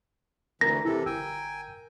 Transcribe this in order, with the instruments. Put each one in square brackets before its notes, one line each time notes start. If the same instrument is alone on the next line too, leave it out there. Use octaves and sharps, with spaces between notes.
[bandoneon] D2 E3 [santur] A#4 [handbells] A#6
[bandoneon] C3 E3 A4 [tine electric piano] E4 G4
[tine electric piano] G1 E6 [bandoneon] G5 G#5